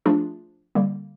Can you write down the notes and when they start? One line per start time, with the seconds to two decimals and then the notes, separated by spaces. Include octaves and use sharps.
0.06 F3 A3 D4 F4 G#4
0.75 D3 G3 A#3